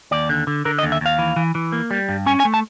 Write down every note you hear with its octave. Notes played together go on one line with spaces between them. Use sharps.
D#2 D5
D3
D3
D3 A#4
D#5
D#2
E5
D#2 F5
E3
E3
E3
A#3
G3
G2
C#4 G#5
G#5
A3
A5